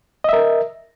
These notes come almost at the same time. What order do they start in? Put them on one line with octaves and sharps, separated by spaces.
D#5 E5 A#4